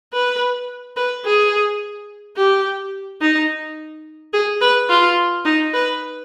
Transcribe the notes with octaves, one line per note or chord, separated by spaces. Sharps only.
B4
B4
G#4
G4
D#4
G#4
B4
F4
D#4
B4